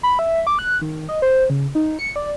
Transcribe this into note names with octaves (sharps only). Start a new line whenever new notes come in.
B5
E5
D6
F#6
D#3
D#5
C5
C#3
D#4
C#7
D5